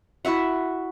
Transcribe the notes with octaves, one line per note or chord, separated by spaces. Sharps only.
E4 F#4 E5 F#5